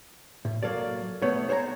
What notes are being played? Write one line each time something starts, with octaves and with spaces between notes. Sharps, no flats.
A2
F#3 A#3 A4 D5
C2 A3 B3 C#5
C5 C#5 F#5 G#5 A#5